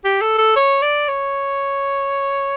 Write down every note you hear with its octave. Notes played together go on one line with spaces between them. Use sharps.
G4
A4
A4
C#5
D5
C#5